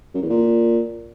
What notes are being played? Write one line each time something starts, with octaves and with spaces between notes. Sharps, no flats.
F#2
E2
A#2